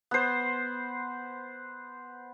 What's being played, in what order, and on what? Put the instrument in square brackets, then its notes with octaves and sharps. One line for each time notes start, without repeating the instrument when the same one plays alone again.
[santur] B3 C5